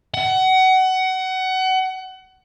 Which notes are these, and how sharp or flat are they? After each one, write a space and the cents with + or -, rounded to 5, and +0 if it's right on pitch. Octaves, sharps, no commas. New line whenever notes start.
F#5 +25